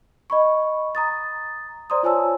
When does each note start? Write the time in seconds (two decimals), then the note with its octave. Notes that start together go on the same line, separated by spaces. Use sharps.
0.30 D#5 B5 C#6
0.95 A#5 D#6 A6
1.90 C5 D5 A#5 C6 D#6
2.03 F4 C5 C#5 G#5 A5 E6